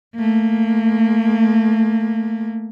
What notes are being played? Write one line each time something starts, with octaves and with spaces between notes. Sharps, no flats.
A3 A#3